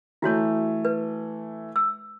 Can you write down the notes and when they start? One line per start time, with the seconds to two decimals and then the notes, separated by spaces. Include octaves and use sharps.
0.22 E3 A3 E4 F#4 C#5
0.85 B4
1.76 E6